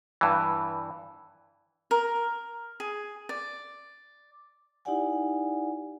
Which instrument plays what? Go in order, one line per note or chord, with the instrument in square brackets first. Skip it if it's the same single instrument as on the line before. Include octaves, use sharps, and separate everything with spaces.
[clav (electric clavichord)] G2 E3
[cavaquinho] A#4
G#4
D5
[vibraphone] D#4 E4 G4 D5 F#5 G#5